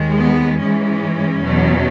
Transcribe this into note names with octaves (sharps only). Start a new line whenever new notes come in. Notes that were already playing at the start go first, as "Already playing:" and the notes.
Already playing: D#2 D#3 G#3
B3
G#2 E3 G#3 C#4
E2 B2 F#3